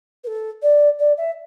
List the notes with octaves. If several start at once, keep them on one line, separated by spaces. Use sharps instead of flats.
B4
A4
D5
D5
E5